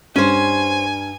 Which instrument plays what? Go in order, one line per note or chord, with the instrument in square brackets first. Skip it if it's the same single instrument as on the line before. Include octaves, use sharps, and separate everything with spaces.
[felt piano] G2 G3 [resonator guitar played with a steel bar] C#4 C5 [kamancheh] G#5